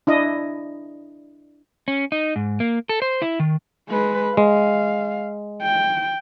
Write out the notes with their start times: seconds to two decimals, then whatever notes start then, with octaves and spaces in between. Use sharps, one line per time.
0.07 D4 E4 D#5
1.88 C#4
2.12 D#4
2.36 G#2
2.60 A#3
2.89 A4
3.02 C5
3.22 E4
3.40 D#3
3.89 G#3 B4
4.37 G#3 F5
5.62 G5